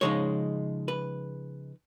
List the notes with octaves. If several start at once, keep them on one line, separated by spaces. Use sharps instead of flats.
C#3 F3 G#3 D#4 C#5
B4